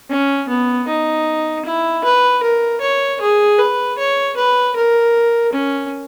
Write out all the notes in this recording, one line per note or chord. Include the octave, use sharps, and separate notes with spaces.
C#4
B3
D#4
E4
B4
A#4
C#5
G#4
B4
C#5
B4
A#4
C#4